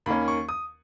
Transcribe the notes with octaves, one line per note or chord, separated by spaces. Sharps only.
D#2 D#3 A#3 C#4 B5
C#6
D#6